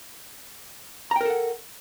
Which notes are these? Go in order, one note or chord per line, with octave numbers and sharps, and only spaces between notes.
A4 A#4 F#5 G5 A#5